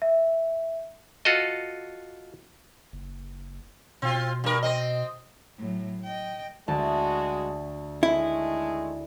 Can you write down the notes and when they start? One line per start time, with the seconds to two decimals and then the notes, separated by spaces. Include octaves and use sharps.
0.02 E5
1.25 F4 F#4 A4 D#5
2.92 F#1
4.02 B2 C4 F4
4.44 G2 A#4
4.63 C4 D#5
5.58 A2 F#3
6.04 D#5 G5
6.68 D2 G#3 F#4 A5
8.03 D#3 G#3 A3 E4